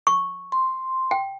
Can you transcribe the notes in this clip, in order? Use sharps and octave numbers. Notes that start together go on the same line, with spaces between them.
C#6
C6
G5